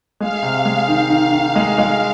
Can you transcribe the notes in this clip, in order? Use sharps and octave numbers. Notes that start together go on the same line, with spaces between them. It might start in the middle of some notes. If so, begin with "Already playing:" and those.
G#3 F5
C3
G#3
D#3
D#3
D#3
G#3
G#3